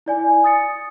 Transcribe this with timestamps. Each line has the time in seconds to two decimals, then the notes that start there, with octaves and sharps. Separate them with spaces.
0.06 E4 D5 G#5
0.44 D#6 A6 C#7